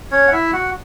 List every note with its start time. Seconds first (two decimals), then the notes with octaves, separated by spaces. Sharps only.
0.11 C#4 C#5
0.27 F#5
0.32 E4 E5
0.53 F#4 F#5